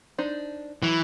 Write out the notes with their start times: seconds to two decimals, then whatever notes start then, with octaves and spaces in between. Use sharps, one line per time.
0.18 D4 D#4 C5
0.83 E3 F#3